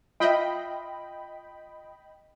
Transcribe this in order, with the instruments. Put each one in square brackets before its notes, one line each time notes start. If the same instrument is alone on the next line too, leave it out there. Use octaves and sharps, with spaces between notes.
[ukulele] F4 E5 [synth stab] D#5 G5 B5